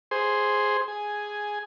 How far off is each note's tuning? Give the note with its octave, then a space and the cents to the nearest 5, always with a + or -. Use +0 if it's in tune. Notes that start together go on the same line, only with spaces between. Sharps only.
G#4 +0 C5 +0
G#4 +0 G#5 +5